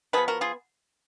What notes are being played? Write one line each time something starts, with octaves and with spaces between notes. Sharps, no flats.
F3 B3 G#4 B4
F#4 A#4
F4 G#4